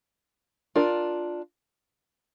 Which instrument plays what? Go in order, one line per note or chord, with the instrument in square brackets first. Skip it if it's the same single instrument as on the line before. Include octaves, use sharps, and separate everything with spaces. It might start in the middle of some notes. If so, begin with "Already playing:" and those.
[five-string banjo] D4 F4 A#4